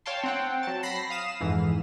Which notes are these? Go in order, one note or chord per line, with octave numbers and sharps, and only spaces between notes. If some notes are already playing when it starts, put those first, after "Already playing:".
C#5 F5 G5 A5 C6
C4 F#5 G5
F#3 A5
B5 A#6 C7
F5 D#6 E7
F2 G#2 E3